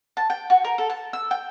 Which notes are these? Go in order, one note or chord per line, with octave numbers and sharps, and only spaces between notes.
A5
G5
F#4
A#4
A4
A5
E6
G5